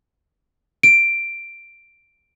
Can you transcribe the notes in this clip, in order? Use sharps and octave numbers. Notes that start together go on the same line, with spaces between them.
D7